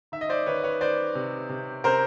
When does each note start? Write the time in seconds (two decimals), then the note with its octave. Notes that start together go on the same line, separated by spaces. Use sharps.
0.12 D#3 E5
0.21 D#5
0.29 C5 D5
0.46 D#3 B4 C#5
0.64 B4 C#5
0.80 D#3 C5 D5
1.15 C3
1.49 C3
1.84 C3 A#4 C5